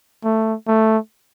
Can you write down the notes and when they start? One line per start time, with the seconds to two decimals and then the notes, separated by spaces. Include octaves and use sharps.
0.24 A3
0.67 A3